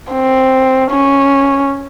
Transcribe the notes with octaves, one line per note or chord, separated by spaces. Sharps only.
C4
C#4